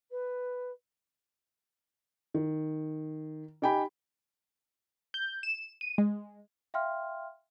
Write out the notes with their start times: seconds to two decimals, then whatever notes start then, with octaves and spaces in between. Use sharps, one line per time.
0.10 B4
2.34 D#3
3.62 D#4 G4 G5 G#5 B5
5.14 G6
5.43 E7
5.81 D#7
5.98 G#3
6.74 E5 F5 G5 C6 F6